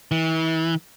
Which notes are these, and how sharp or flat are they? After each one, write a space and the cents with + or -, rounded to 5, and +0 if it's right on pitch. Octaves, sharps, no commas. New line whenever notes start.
E3 -35